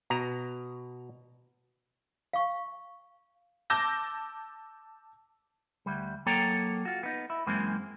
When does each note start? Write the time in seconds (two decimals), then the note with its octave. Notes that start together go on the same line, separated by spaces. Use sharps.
0.10 B2 A#5
2.33 F5 C#6
3.70 A5 D6 E6 G6 A#6
5.86 D2 G3
6.26 F#3 A#3 A4 C#5 G5 A#5
6.85 F4 F#4
7.03 B3 D#4
7.30 E4
7.47 F#2 E3 G#3 A#3 C4